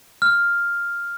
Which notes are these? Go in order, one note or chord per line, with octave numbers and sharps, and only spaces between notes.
F6